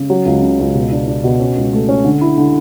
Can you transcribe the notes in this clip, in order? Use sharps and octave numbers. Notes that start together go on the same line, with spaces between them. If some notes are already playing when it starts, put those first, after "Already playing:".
Already playing: C#3
F#3
C#2
C#3
C#2
B2
D4
D4
B2
C#4
C#2
A3
C#4
D3
E4
D3